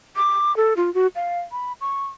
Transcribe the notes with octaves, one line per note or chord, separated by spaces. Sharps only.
D6
A4
F4
F#4
F5
B5
C#6